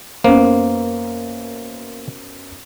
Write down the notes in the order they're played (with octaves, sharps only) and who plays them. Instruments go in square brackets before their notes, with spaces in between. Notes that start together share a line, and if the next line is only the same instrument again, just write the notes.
[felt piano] F#2 B3 C5 [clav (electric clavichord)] A#3